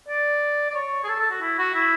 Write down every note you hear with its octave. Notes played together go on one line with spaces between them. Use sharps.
D5
D5
C#5
G#4
A4
A4
F#4
E4
F#4
E4